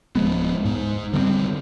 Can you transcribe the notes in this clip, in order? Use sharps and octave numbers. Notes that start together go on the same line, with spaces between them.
D1 F3 G#3 B3
G#2
D3 G3 A3 C4